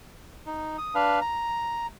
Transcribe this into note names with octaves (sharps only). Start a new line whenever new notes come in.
D#4
D#6
D4 B4 F5
A#5